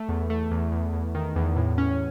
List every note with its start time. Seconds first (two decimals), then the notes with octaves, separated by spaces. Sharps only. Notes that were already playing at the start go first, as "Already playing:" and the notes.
Already playing: A3
0.09 E2
0.30 A3
0.51 E2
0.72 E2
0.93 E2
1.15 D#3
1.36 E2
1.56 A2
1.78 C#4